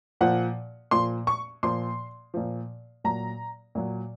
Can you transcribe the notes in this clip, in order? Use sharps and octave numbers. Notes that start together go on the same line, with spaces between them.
A#2 F3 F#5
A#2 F3 C6
C#6
A#2 F3 C6
A#2 F3
A#2 F#3 A#5
A#2 F#3